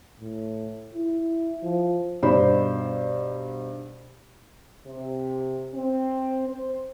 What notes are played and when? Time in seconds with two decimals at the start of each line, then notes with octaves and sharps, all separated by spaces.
0.20 A2
0.95 E4
1.63 F3
2.23 G2 B2 D#4 C5 D5 B5
4.87 C3
5.75 C4
6.48 C5